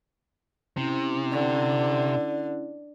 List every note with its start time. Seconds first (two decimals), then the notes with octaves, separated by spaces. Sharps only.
0.77 C3 C#4 E4
1.32 D3